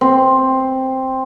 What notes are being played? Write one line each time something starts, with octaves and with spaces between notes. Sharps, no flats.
C4